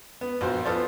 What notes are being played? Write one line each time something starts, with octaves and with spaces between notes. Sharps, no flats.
B3
A#1 F#4 C5
B3 F4 A4 C5 D5